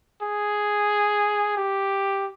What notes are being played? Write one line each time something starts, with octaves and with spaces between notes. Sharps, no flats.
G#4
G4